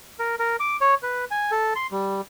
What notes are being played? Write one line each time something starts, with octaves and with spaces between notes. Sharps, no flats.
A#4
A#4
D6
C#5
B4
G#5
A4
C6
G3